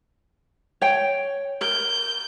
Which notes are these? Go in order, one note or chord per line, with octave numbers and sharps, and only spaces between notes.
C#5 G5
A#4 G6